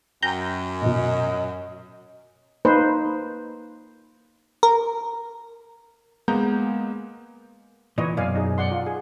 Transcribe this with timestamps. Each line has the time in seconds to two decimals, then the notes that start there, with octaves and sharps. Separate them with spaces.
0.22 F#2 G5 A#5 G6
0.82 A#1 G#2 B2 D#5
2.65 A#3 D#4 B4 C5
4.63 A#4
6.28 G#3 A#3 B3 A#5 G6
7.98 A#2 E3 B4 C#5 D#5
8.17 F#2 B2 D5 F5 G#5
8.35 D#4 G#4
8.58 D5 F#5 C6
8.71 F4
8.86 G#4